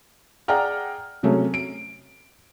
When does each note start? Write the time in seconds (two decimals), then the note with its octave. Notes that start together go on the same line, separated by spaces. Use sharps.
0.48 G#4 D5 F#5 G5 A#5 F6
1.23 C3 F#3 A3 C#4 G#4
1.54 D7